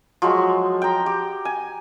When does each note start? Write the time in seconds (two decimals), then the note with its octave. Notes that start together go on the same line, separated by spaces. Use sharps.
0.22 F3 F#3 G#3
0.82 G5 A#5
1.06 G4
1.45 G#5